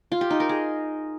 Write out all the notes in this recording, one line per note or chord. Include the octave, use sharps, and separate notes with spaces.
F4
G4
D#4
A#4
G#4